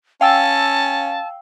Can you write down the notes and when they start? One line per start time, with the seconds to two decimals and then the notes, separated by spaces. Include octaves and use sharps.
0.21 C#4 F5 G5 A5 E6